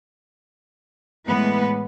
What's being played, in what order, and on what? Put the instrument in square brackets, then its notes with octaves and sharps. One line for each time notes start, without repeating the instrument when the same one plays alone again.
[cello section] A2 E3 G#3 B3 B4